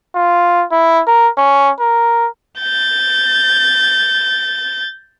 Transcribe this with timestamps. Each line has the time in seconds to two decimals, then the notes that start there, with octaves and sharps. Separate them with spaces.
0.15 F4
0.72 E4
1.08 A#4
1.38 C#4
1.80 A#4
2.60 G6 A6